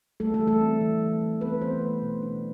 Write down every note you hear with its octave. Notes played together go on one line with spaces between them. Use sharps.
G3 A3 A4
A3 A4
E3
A3 A4
C4
E3
A3
E3
B3 C4 B4
E3 C4 C5
A3
B2
D4